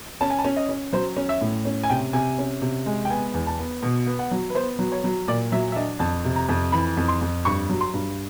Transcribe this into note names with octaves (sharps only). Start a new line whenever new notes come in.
C#4 A5
G#5
A5
C#4
D#5
C#4
F#3 C5
C#4
E5
A2
C#4
G#5
C3 G5
C3 G#5
C#4
C3
G#3
G5
B3 G#5
E2
A5
B3
B2
B3
F#5
F#3
B4
B3 C5
F#3
C#5
F#3
A#2 D5
F#3 E5
E5
D4 D#5
F2 A5
C3
A#5
F2
E3 B5
F2
C6
F2
G2 C#6
F#3
C6
G2